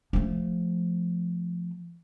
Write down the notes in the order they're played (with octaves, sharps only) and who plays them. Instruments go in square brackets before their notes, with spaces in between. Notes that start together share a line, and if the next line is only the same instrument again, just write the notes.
[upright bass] F3 A3